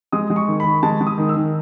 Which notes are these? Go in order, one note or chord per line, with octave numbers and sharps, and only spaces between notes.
G#3 D#6
G#3
C#6
D#3
B5
D#3
G#3 A5
G#3
D#6
D#3
E6
D#3